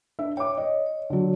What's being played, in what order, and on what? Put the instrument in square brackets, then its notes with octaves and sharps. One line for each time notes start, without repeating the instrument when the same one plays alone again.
[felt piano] D4 E5
[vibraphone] C#5 [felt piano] G5 D6
[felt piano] D#5
[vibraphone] C#5
[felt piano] D3 F#3